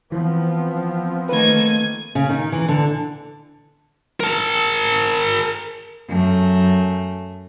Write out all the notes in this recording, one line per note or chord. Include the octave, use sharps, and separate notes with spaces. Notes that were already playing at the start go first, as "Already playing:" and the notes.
E3 F3 B3 C4
D#3 A3 A#3 B4 G#6 D#7
C#3
D#3
E3
D3
A#4 A5
F#2 A3